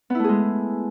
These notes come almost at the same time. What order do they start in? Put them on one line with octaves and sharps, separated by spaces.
B3 E4 A3 G#4 G#3